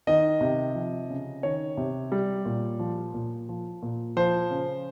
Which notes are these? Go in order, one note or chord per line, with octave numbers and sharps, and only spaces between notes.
D#3 D#5
C3
F3
C#3
D#3 C#5
C3
G3
A#2
F3
A#2
F3
A#2
F3 C5
C#3